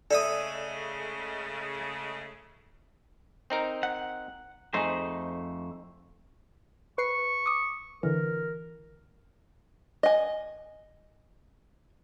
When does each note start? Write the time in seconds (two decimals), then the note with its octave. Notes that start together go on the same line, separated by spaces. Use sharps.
0.11 C#3 G#3 A3 A4 D5 E5 D#6
3.50 C4 D#4 A#4
3.83 F#5
4.74 F2 A3 D#4 G#4 C5
6.98 B4 C#6 C7 C#7
7.46 D6 D#6
8.03 D3 E3 A#4
10.03 D#5 G#5